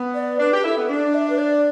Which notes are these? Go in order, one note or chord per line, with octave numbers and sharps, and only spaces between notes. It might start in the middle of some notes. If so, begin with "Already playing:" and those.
Already playing: B3
D5
D4 B4
G4
E4 A4
B3
D4 D5
E5
B4
D5